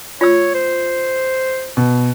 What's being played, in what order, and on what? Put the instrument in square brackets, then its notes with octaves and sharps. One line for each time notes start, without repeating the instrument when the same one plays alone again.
[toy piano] F4 E6 [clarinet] C#5
[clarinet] C5
[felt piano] B2